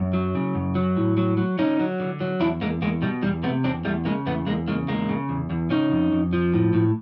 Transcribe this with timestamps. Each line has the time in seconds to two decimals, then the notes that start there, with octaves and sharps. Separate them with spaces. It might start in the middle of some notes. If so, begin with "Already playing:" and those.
Already playing: F#2
0.13 F#3
0.35 C#3
0.55 F#2
0.75 F#3
0.97 A2
1.17 F#3
1.37 F#3
1.59 D3 C#4 D#4
1.79 F#3
2.00 D3
2.20 F#3
2.40 E2 D4 E4
2.61 E2 G#3 A#3
2.82 E2 G#3 A#3
3.02 B2 G3
3.23 E2 G3
3.43 C3 A3 B3
3.64 E2 C4 D4
3.85 E2 G3 A3
4.05 C#3 G#3 A#3
4.26 E2 A3 B3
4.46 E2 G#3 A#3
4.68 C#3 G#3 A#3
4.88 E2 G#3 A#3
5.09 C#3
5.29 E2
5.50 E2
5.70 C#3 C#4 D#4
5.91 F2
6.12 F2
6.33 F3
6.53 A2
6.73 A2